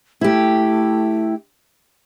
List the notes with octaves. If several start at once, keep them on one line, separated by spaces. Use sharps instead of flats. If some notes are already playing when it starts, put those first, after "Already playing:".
A3 E4 G4